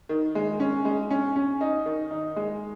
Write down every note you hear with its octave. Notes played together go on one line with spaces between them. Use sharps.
D#3
G#3
C#4
G#3
C#4
C#4
D#4
D#3
D#4
G#3